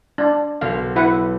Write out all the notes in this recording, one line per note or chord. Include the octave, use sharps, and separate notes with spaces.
D4
B1 F5
E4 B4 F#5